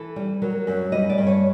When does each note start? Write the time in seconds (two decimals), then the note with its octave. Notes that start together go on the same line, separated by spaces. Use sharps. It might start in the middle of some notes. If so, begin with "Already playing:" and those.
Already playing: E3 A4
0.16 G3
0.42 F#3 A#4
0.67 F#2
0.92 G3 D#5
1.10 D5
1.18 G2
1.27 C#5